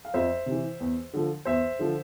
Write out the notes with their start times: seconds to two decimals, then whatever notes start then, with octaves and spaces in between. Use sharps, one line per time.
0.05 F5
0.14 F2 C5 E5
0.46 C3 E3
0.80 E2
1.13 D3 F3
1.45 E2 C5 E5
1.79 D3 F3